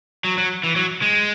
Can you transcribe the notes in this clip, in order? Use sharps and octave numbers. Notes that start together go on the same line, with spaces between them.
F#3
F#3
E3
F#3
G#3